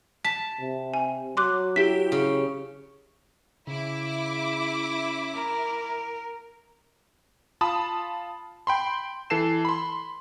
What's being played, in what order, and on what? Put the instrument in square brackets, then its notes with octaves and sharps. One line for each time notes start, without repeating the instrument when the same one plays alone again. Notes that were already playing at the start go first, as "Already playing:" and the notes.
[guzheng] A5 [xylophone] B6
[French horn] C3
[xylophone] G#5
[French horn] F#3 [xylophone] C6 D6 F#6
[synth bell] E4 G4 [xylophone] B6
[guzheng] C#3
[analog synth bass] C#3 [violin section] E4 D6
[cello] A#4
[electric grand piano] F4 A5 B5 D#6
G5 B5 C6
E3 A4 C7 E7
B5 C6